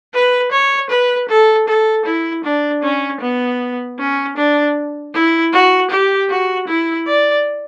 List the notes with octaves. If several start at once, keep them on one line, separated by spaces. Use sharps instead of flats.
B4
C#5
B4
A4
A4
E4
D4
C#4
B3
C#4
D4
E4
F#4
G4
F#4
E4
D5